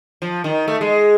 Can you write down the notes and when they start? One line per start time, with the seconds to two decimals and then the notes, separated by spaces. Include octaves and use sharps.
0.22 F3
0.44 D#3
0.68 A3
0.81 G#3